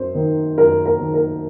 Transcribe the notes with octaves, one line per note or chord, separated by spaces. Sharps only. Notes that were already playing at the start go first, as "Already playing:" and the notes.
Already playing: F#2 C5
D#3
F#2 A#4
A#4
D#3
A#4